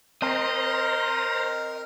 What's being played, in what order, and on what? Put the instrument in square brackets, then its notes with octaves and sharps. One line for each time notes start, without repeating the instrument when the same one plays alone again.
[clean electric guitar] C4 [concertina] A#4 [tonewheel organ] C5 A#5 [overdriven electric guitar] D#5